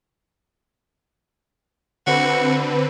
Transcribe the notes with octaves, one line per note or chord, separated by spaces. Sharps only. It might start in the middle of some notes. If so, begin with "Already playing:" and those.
D3 C4 F#4 B4